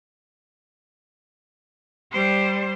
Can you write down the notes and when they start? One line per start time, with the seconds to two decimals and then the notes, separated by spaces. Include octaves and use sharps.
2.12 G3 C5